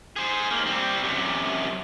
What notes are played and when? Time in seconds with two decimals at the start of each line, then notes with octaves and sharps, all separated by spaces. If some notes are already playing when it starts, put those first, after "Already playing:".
0.16 G#4 C5
0.51 D#2 A#3
0.66 G3 C4
1.04 F#2 C3